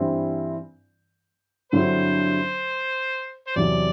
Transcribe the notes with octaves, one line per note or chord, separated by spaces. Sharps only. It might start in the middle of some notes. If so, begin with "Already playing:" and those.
Already playing: G2 E3 G3 C4 E4
G2 D3 F#3 C4 E4 C5
C5
E2 C3 F#3 D5